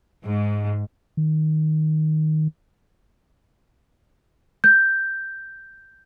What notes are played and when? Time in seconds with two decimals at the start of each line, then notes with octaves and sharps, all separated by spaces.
0.25 G#2
1.17 D#3
4.64 G6